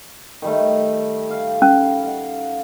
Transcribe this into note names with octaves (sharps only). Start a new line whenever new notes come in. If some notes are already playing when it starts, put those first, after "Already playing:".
D#3 G3 A3
F5
C#4
F5 F#5